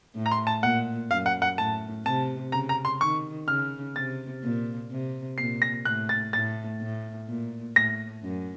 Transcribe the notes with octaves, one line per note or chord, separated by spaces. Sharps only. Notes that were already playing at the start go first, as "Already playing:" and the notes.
A2
A#5
C6
A5
A#2 F#5
F#2 F5
F#5
F#5
A2 A5
C3 A5
C#3 A#5
A#5
C6
D#3 C#6
C#3 F6
C3 A6
A#2
C3
A#2 C7
A#6
A2 F#6
A6
A2 A6
A2
A#2
A2 A#6
F#2